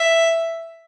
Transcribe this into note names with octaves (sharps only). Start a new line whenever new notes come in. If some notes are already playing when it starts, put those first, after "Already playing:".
Already playing: E5